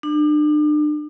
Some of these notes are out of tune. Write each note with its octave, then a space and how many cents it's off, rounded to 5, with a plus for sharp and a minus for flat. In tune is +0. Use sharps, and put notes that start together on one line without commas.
D4 +40